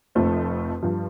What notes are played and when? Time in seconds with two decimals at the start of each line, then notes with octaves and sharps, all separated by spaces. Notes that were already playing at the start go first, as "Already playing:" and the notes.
0.15 F1 F2 F3 A3 C4
0.83 G2 F3